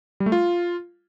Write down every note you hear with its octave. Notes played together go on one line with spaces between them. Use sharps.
G3
A3
F4